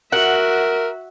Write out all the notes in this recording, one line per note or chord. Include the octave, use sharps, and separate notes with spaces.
F#4 A#4 E5 F#5